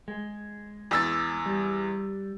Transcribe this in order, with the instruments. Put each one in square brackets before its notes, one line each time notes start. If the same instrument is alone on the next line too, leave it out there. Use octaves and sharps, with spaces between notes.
[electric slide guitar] G#3
[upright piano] E2 E6 A6
[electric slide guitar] G3